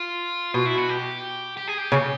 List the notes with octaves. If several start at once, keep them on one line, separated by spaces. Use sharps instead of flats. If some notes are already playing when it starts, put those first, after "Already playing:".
Already playing: F4
B2 F4
E4
F#4
G4
G4
G#4
G4
C#3